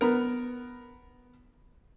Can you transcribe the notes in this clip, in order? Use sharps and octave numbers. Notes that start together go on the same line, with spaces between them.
B3 A#4